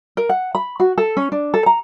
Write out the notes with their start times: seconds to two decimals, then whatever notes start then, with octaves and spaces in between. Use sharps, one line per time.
0.17 A#4
0.29 F#5
0.55 B5
0.80 F#4
0.98 A4
1.17 C#4
1.32 D4
1.54 A4
1.66 A#5